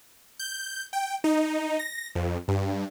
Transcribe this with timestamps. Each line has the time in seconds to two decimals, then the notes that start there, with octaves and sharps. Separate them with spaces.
0.39 G6
0.93 G5
1.24 D#4
1.79 A#6
2.15 F2
2.48 G2